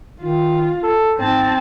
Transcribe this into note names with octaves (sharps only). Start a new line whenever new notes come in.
D#3 F4
A4
G#2 C4 A5